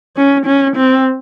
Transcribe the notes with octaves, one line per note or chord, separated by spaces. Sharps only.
C#4
C#4
C4